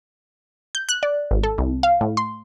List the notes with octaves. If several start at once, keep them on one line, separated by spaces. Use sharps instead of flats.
G6
F#6
D5
G#1
A4
C2
F5
A2
C6